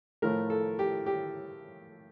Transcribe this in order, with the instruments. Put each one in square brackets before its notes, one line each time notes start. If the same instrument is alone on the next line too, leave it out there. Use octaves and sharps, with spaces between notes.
[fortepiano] A2 F3 A3 A#4
A4
G4
G4